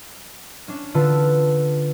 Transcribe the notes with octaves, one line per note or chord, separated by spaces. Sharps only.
C#4 D4
D3 F4 B4 A5 E6